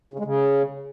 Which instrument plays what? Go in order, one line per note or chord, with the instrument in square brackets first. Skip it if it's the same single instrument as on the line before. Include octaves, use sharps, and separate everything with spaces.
[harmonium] C#3
G#3
C#3